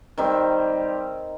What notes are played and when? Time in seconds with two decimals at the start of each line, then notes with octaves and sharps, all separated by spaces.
0.18 D#3 G3 C4